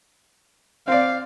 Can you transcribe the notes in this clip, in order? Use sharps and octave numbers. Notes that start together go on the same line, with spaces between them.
C4 D5 F5